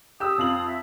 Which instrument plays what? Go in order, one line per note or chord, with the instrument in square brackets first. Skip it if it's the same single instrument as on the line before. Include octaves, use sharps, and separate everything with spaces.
[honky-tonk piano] G4 E6 [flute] D#6
[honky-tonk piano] F2 F5 F#7
[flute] E5